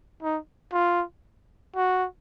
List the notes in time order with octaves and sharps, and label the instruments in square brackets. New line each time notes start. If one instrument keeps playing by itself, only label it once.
[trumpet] D#4
F4
F#4